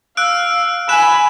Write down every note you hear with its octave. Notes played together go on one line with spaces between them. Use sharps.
F5 E6 F#6 D7
G#5 B5 F#6 E7